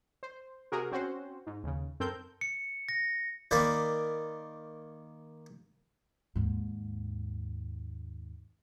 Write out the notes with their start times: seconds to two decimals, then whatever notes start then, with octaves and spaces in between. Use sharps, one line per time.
0.23 C5
0.72 C3 F#4 G#4 A#4
0.92 C4 C#4 F#4 C5
1.46 G#2
1.63 D#2 C#3
2.00 F#2 C4 A4 A#4 G6
2.41 C#7
2.89 A#6
3.51 D#3 A#3 A#4 D5 F5 B5
6.36 D#2 G#2